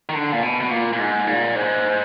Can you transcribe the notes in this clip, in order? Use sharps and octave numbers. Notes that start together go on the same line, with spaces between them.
D#3
D3
A#2
B2
B2
A#2
A#2
G#2
A#2
G#2